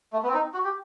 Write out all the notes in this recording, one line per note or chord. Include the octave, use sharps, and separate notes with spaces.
A3
B3
C4
D#4
F#4
G4